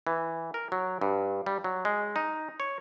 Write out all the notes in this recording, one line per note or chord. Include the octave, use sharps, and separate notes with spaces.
E3
A#4
F#3
G2
G3
F#3
G#3
D#4
C#5